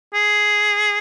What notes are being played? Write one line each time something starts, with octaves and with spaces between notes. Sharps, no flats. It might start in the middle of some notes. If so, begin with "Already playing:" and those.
G#4